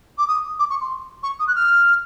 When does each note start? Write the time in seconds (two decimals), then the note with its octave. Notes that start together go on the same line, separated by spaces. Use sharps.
0.18 D6
0.27 D#6
0.59 D6
0.70 C#6
0.80 C6
1.23 C#6
1.39 D#6
1.47 F#6
1.55 F6